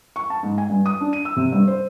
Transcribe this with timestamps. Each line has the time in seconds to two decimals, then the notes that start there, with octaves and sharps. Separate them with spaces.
0.16 C#6
0.30 A5
0.43 G#2
0.58 G#5
0.70 G2
0.86 D#6
1.01 D4
1.13 D#7
1.25 E6
1.36 C3
1.52 G2
1.67 C5